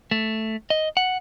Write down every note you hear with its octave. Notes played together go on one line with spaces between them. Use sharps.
A3
D#5
F#5